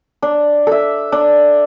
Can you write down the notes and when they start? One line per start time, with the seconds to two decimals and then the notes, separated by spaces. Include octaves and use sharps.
0.22 D4
0.67 A4 E5
1.12 D4